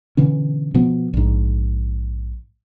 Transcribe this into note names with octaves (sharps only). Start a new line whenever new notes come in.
B2 D3 E3 C#4
B2 F3 B3
A#1 G#2